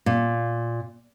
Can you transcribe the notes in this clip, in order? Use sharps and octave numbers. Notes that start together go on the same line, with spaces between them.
A#2